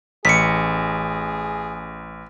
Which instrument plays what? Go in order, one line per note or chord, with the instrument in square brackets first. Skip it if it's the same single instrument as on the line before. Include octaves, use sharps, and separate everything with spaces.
[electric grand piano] A1 [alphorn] G#4 [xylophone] B6 C#7